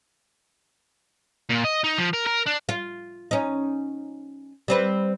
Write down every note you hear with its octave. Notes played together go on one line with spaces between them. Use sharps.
A#2
D#5
D#4
F3
A#4
A#4
D4
F4
C#4 D#4
G3 C4 B4